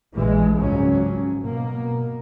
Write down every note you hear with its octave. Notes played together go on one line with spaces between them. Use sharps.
A#1 E3 G#3
G#1 C#2 F3 F#3 C#4
B2 A#3